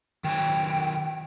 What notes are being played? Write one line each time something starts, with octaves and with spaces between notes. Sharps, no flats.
D#3 F#3 G5 G#5